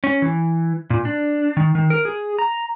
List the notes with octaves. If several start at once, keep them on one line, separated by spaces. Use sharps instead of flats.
C#4
E3
A#2
D4
D#3
D#3
A#4
G#4
A#5